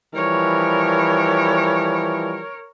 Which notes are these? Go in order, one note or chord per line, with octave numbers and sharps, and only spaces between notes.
E3 F3 G3 A#4 C#5